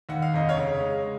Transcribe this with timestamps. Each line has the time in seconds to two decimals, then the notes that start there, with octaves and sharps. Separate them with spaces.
0.09 D#2 F#5
0.22 F5
0.33 F1 D#5
0.49 C#5 F5
0.57 C#3
0.80 G#3